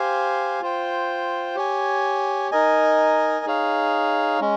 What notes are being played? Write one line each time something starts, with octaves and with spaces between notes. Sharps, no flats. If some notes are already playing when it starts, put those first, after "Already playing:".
Already playing: G4 C5 F5 G#5
F4 C5 G5
G4 C#5 G#5
D#4 A#4 D#5 G#5
D#4 G#4 C#5 F5
G#3 C#4